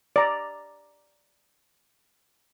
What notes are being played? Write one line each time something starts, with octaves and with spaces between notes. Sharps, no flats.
D5 A#5